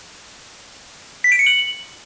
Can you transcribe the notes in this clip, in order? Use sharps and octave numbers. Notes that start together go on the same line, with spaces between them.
B6
D7
C#7
F#7